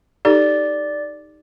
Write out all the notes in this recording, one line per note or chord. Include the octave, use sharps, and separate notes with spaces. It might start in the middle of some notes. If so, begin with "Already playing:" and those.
D#4 G4 A4 D5